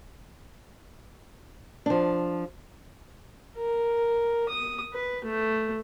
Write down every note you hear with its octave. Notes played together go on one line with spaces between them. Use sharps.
F3 D4
A#4
D#6
B4
A3